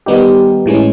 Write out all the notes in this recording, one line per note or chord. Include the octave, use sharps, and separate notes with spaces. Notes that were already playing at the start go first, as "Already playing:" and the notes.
D#3 G3 B3 D#4 G4
A2 E3 G#3 C#4